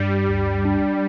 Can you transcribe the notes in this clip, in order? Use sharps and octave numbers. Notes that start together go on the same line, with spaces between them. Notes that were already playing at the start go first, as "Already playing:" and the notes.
Already playing: G2 G3
D2
D4